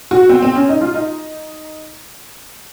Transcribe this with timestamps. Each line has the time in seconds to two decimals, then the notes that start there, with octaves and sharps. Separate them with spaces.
0.11 F#4
0.29 C4
0.42 C4
0.55 C#4
0.69 D#4
0.81 F4
0.95 D#4